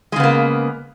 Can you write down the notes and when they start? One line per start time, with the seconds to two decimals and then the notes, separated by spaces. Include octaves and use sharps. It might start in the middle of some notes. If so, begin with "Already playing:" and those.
0.12 G#3
0.16 C#3
0.20 B3
0.23 A#3